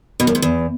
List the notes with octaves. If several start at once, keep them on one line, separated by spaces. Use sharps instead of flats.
B2
F#2
G#2
E2